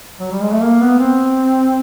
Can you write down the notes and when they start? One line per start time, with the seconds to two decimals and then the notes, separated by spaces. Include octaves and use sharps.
0.20 F#3
0.31 G3
0.41 G#3
0.52 A3
0.62 A#3
0.81 B3
0.99 C4